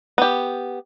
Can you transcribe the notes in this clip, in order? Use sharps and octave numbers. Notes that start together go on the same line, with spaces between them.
B3 G4